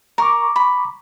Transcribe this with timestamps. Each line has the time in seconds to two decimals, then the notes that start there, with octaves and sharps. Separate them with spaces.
0.18 A#4 A#5 C#6 D6
0.56 B5